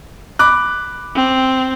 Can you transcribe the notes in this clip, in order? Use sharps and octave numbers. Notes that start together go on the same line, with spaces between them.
B5 D6 F#6
C4